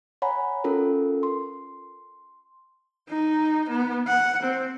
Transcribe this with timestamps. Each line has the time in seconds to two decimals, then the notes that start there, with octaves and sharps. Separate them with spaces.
0.22 C#5 F#5 G#5 A#5 B5
0.64 C#4 F4 A4 A#4
1.23 C6
3.09 D#4
3.70 B3
4.07 F#5
4.43 C4